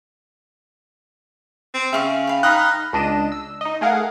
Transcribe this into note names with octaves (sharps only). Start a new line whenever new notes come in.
C4
C#3 E5 F5 G5 C#6
B4 F5
D#4 G5 B5 D#6 F6 F#6
C#2 D4 D#5 D#7 E7
E6
D#4 D#5
A3 G#4 A#4 F5 F#5